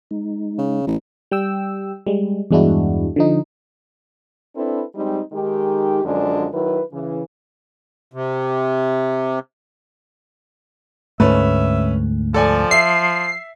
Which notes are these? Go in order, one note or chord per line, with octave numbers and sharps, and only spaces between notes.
G#3 D#4
C#3
A1
G3 G5 E6
G3 G#3
E2 G2 G#3 D4 E4 F#4
D3 F3 D#4
C4 D4 E4 A4 B4
G3 G#3 C4 D#4
D#3 G#3 D#4 G4
F#2 D3 F3 G#3 D4
D#3 F#3 E4 B4
C#3 E3
C3
D2 G#2 A3 C#4 B4 E5
F3 A4 D5 G#5
E5 C7